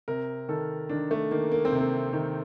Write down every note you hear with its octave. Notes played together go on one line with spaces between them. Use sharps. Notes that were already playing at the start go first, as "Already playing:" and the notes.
C3 A#4
D#3 A4
D#3 D4
A3
D#3 A#3
A#3
C4
C3
A#3
D#3